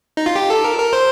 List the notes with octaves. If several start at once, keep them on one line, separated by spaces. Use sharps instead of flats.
D#4
F4
G4
A4
A#4
A#4
C5